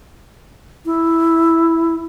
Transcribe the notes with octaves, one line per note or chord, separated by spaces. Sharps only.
E4